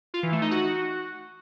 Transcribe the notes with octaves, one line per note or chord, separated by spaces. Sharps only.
F4
E3
A3
D#4
F#4